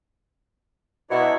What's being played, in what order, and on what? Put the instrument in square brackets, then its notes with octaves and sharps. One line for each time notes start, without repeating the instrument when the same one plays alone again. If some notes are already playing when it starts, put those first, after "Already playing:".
[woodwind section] B2 [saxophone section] F#3 D4 E4